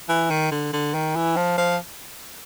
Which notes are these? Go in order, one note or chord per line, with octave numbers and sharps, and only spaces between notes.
E3
D#3
D3
D3
D#3
E3
F3
F3